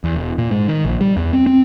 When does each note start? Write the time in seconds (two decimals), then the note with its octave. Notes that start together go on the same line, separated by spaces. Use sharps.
0.04 E2
0.16 E1
0.38 A#2
0.51 G#2
0.68 D#3
0.85 A#1
1.01 G3
1.17 E2
1.33 C4
1.46 C4